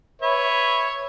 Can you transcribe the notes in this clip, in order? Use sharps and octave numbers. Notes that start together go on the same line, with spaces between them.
B4 C#5 E5